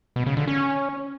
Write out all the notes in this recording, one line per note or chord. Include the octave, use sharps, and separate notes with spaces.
B2
C#3
D3
C#4